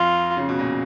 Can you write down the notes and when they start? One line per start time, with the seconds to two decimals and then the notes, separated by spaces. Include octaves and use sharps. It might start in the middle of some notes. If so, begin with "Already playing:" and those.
Already playing: F2 F4
0.37 C#3
0.49 B2
0.59 A#2